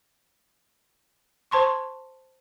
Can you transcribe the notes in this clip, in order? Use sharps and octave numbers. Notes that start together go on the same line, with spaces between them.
C5 A5 C6 C#6